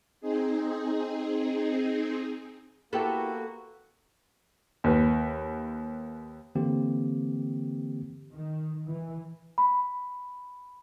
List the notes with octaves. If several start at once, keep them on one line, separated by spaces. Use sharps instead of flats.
C4 D#4 G#4
A#3 B3 E4 F#4 G4 A4 B4
D#2 B4
D3 E3 A#3 C4 G4
D#3
E3
B5